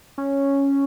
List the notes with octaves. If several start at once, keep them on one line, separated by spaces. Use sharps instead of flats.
C#4